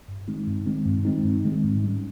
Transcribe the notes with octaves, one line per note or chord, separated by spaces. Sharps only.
G2
D#3 G#3 C4 D#4
G2
D#3 G#3 C4 D#4
G2
D#3 G#3 C4 D#4
G2
D#3 G#3 C4 D#4
G#2
G3 C#4